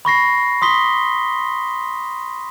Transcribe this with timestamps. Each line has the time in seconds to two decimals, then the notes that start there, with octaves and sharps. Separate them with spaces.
0.05 B5 C#6 A#6 C7
0.62 C6 D#6 B6 G7